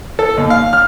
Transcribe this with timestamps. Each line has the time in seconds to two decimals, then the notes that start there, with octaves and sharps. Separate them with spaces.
0.19 A4
0.37 D#2
0.50 F5
0.73 F6